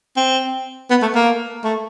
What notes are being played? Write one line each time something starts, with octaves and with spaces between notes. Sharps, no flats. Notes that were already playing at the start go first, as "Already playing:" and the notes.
C4
B3
A3
A#3
A3